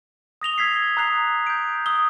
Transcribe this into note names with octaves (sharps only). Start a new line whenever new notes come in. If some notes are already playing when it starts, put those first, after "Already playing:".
D#6 A#6 F7 G7
E6 G#6 B6 C7
A#5 D#6 F#6 C7 F7
G6 D7
D#6 E6 G7